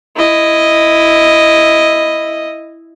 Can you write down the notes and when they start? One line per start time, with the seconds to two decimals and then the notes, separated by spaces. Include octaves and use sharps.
0.16 E4 D#5